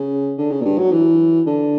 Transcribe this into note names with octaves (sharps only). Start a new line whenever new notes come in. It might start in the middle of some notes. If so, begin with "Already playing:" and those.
Already playing: C#3
D3
C#3
A#2
G2
F#3
E3
D3